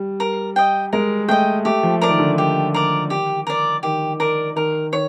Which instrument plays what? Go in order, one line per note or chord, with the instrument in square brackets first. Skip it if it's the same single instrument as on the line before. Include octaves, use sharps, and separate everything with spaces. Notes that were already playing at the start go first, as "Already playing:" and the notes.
Already playing: [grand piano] G3
[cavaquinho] A#4
D#5 G5
[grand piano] G#3 [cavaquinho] A#4
[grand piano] A3 [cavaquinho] D#5 G5
[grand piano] A3 [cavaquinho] G4
[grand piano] F3
[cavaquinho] A#4 D5
[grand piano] D#3
D3
[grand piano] D#3 [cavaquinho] G4
[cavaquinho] A#4 D5
G4
A#4 D5
[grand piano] D#3 [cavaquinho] G4
[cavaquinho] A#4 D5
[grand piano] D#3 [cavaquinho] A#4
[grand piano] D#3 [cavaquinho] C#5